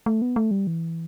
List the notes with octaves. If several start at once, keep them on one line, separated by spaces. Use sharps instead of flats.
A3
B3
A3
G3
E3